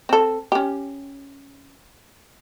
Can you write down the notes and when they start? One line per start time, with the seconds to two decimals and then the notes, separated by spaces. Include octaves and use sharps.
0.09 C4 A4
0.52 C#4 G4